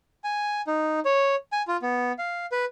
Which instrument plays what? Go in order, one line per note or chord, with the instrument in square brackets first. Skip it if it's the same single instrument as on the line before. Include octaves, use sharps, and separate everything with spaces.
[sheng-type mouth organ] G#5
D#4
C#5
G#5
F4
B3
F5
B4